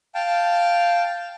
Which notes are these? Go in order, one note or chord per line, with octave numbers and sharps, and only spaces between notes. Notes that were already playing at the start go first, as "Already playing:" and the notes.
F5 G5 A5